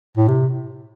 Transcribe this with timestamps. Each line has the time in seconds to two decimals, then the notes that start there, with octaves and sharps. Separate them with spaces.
0.17 A2
0.28 C3